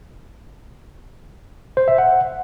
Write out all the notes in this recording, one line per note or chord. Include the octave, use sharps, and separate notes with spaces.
C5
E5
F#5